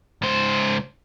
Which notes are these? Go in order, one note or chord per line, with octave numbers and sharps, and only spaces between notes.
C#2 C5